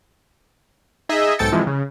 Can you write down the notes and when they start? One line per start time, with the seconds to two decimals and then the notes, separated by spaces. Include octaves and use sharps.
1.09 D#4 G#4 D#5 E5
1.39 B1 G#2 A4 G5 A6 C#7
1.52 C3 E3 F3 G#3
1.67 C#3